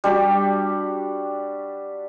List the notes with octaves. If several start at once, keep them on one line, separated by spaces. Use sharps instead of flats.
G3 D4 F#4 G4